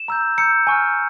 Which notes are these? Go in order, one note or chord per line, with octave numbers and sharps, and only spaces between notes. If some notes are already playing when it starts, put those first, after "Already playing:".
Already playing: E7
A#5 E6 G6
A#5 E6 G6 C#7
G#5 C#6 F6